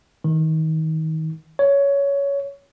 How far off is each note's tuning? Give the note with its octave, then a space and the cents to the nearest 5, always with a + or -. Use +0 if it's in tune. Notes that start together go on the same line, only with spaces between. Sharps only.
D#3 +30
C#5 +15